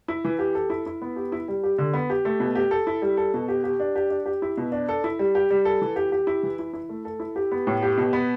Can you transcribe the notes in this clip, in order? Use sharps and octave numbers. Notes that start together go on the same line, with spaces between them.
E4
E3
G4
A4
E4
E4
B3
G4
E4
G3
G4
D3
B3
G4
A3
B2
G4
A4
E4
G3
A4
B2
G4
G4
D4
G4
D4
G4
E4
B2
D4
A4
E4
G3
G4
G3
A4
E3
G4
G4
E4
E3
E4
E4
A3
A4
E4
G4
B3
A2
G4
B2
B3